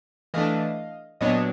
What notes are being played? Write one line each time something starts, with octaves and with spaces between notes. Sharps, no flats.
E3 A3 D4 D#5 F5
A#2 F#3 B3 D4 C#5 D#5